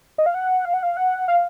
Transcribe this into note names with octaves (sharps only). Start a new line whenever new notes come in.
D#5
F5
F#5
F5
F#5
F5
F#5
F5